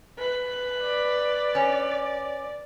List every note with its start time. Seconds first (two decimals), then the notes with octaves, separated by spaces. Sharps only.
0.18 B4
0.82 D5
1.55 C#4